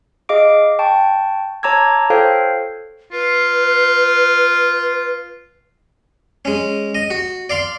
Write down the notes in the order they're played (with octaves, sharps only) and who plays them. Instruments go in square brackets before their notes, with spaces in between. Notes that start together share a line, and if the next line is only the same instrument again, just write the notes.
[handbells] G#4 D#5 F5 D6 D7
G5 A5 C#6
C#5 A5 A#5 D6 E6 G#6
F4 A4 C5 C#5 F5 G5
[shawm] F4 [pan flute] B4
[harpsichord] G#3 C#4
D#5
F#4
D5 F5 C6